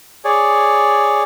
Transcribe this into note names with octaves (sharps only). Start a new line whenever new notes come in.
G#4 C#5 D5